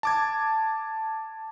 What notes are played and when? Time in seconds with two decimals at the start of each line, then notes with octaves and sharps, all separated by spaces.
0.03 A5 D6 G#6